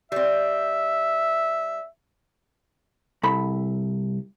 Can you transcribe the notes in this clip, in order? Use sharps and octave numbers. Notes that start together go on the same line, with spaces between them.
G3 C4 E5
C2 A4 B5